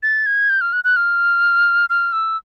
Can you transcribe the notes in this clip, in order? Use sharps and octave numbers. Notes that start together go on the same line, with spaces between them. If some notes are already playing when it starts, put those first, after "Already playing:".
A6
G#6
G6
F6
F#6
F#6
F6
F6
E6